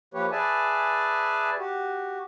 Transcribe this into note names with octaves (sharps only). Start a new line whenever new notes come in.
F3 A#3 G4 B4 C#5
G#4 B4 D5 E5 G#5 A5
F#4 G4